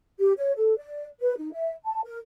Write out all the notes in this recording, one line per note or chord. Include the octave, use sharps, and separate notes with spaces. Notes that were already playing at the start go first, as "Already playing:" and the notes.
G4
C#5
A4
D5
B4
D#4
E5
A5
A#4